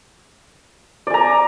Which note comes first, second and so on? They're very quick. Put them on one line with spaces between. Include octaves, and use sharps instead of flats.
D5 G#5 A#5